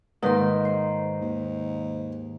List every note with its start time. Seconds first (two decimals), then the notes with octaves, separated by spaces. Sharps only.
0.23 G#2 D#3 A#3 D#4 B4 C6
0.65 C5
1.21 D#2